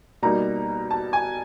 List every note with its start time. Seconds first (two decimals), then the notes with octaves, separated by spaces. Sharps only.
0.22 B2 G3 A#3 D#4 A#5
0.91 A5
1.13 G#5